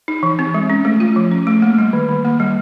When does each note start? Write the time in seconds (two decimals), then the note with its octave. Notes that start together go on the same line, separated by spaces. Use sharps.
0.08 D#4
0.23 E3
0.39 C4
0.54 G#3
0.70 C#4
0.85 A3
1.00 F4
1.16 F3
1.31 C#4
1.47 A3
1.62 A#3
1.79 G3
1.93 D#3
2.09 D#3
2.25 A#3
2.40 G3